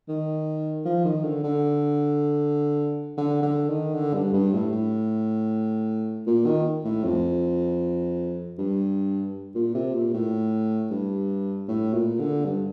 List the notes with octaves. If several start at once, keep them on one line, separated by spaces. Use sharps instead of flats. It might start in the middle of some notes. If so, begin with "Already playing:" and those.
D#3
F3
D#3
D3
D3
D3
D3
D#3
D3
G2
G2
A2
A2
A#2
D#3
A2
F2
G2
A#2
C3
A#2
A2
G2
A2
A#2
D3
G2